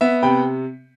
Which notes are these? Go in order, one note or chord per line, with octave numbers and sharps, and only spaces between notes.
B3 E5
C3 G5 B5